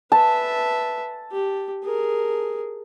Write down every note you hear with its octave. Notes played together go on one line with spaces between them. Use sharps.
B4 E5 A5
G4
G#4 A#4